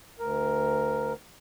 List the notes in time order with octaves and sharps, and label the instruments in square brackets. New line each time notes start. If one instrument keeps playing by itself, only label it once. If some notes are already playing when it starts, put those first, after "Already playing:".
[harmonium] D2 A#4